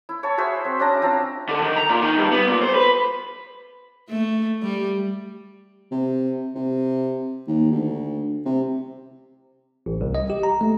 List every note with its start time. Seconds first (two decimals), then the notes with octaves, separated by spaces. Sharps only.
0.09 E4
0.23 C#5 A5
0.38 F#4 G#4 C5 E5
0.65 C4
0.79 C#4 D4 A5 A#5
1.02 C4 F4 A5 A#5
1.49 D3
1.62 D#3
1.76 A#5
1.89 A#2
2.02 D#3
2.17 G2
2.32 B3
2.47 A#2
2.61 C5
2.74 B4
4.09 A3
4.62 G3
5.91 C3
6.55 C3
7.47 D#2
7.71 D2
8.45 C3
9.86 A1
10.01 C2
10.15 D#5
10.30 G4
10.43 A#5
10.61 A3